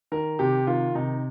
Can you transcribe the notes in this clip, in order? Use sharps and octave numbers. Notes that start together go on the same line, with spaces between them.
D#3 A#4
C3 G4
D#3 F4
C3 D#4